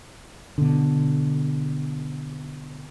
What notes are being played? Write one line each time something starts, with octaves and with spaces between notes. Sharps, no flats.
B2 D3